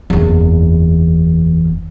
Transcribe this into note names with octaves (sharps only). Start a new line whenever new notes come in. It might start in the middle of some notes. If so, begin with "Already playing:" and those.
F#1 E2